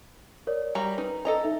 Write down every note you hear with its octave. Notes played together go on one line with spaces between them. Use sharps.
A#4 C#5 D5
G3 F#4 A#5
D#4 B4
A4 D#5 A#5
D#4 E5